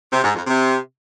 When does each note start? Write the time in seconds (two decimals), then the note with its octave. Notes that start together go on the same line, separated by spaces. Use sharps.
0.12 C3
0.24 G#2
0.35 F2
0.46 C3